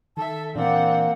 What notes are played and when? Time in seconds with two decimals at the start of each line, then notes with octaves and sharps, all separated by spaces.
0.17 D#3 A4 E5 A5
0.56 A#2 E3 A#3 C4 D4 D5 F#5